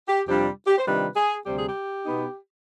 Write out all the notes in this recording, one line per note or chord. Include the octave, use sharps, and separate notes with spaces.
G4
F2 C3 G3 D4 F4 G4
G4
C5
C3 D#3 G3 D4 F4 B4
G#4
D2 C3 G3 G4
G#4
G4
B2 B3 D#4